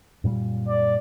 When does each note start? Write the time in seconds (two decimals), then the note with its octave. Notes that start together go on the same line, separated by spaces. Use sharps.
0.24 F#2 A#2 G3
0.68 D5